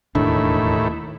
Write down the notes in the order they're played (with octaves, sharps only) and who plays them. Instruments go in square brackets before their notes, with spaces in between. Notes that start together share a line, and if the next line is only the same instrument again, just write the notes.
[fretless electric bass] E1 D4 [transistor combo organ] D#2 A2 E4